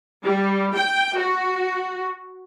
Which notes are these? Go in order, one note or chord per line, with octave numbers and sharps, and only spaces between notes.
G3
G5
F#4